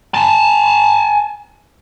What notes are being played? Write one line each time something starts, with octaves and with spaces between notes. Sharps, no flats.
G#5 A5